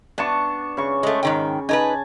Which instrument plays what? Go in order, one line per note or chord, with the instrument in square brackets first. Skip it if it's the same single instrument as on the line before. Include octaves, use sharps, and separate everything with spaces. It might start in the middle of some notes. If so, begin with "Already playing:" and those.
[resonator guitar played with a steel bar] B3 [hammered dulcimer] D4 A5 C#6
[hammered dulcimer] C#3 C#6
[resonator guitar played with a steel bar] G#3 A3
G#2 D#3 G5
[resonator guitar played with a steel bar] D#4 A#4 B4 [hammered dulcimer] G#5 A5